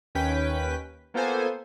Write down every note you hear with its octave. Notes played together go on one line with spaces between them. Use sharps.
D#2 C#4 B4 G5 B6
A#3 B3 F4 A4 C5 G#5